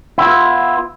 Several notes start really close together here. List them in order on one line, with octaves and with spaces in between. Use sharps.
E4 F4 B3